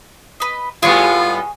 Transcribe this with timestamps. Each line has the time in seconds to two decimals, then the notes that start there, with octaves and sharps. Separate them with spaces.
0.40 B4 D#5
0.83 A2 G3 B3 F4 G#4 C#6